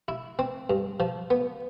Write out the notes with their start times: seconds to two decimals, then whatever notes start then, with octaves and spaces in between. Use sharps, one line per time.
0.08 E4
0.39 C4
0.70 G2
1.00 F3
1.30 B3